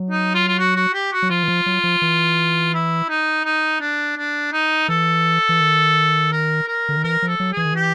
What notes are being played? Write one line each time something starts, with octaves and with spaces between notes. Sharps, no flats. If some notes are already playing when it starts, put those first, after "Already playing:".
Already playing: F#3
D#4
F4
F4
F#4
F#4
G4
F#4
F#3
F3 F4
E3
F3
F#3
F3
E3
E4
D#4
D#4
D4
D4
D#4
E3 A4
E3
D#3
A#4
A#4
D3
D#3
E3 A#4
F3
A4
F#3
G#4
E3
D#3
E3 G4